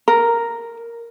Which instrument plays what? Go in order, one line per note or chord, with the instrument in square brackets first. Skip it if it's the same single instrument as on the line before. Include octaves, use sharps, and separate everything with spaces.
[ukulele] A#4